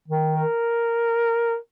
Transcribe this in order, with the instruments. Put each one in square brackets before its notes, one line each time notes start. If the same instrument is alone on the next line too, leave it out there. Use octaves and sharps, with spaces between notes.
[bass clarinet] D#3
[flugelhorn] A#4